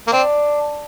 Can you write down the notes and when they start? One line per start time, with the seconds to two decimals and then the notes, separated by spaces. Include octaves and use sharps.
0.07 A#3
0.12 C4 D4